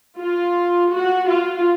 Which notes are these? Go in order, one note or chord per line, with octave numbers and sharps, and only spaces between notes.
F4
F#4
F4